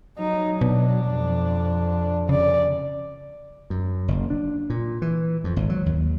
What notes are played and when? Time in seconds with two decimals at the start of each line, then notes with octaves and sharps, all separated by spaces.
0.19 F#3 D#4
0.61 B2 D4
1.09 F2
2.29 C#3 D5
3.70 F#2
4.08 F#1
4.30 D4
4.70 A#2
5.02 E3
5.44 F2
5.56 G#1
5.70 F#3
5.86 D#2